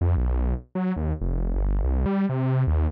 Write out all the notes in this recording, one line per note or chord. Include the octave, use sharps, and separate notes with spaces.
F2
B1
F#3
D#2
F1
G1
C2
G3
C3
D#2